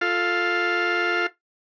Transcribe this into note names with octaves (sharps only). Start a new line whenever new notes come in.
F4 A4 F5